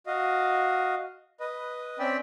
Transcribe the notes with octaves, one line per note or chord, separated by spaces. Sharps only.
F#4 D#5 F5
B4 D#5
C4 C#4 D5 E5 G5